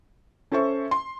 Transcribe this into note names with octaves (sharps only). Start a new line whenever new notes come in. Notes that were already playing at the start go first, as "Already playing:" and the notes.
C#4 A4 C5 E5 C#6
C6